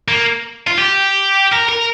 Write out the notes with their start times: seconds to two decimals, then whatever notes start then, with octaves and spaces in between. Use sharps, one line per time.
0.08 A#3
0.67 F4
0.78 G4
1.53 A#4
1.69 A#4